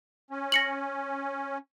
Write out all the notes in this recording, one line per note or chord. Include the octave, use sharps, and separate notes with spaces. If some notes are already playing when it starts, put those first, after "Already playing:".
C#4
A#6 C#7 F#7